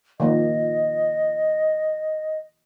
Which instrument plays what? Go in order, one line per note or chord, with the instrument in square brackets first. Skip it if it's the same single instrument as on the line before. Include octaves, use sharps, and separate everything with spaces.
[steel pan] D#3 F3 A#3 [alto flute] D#5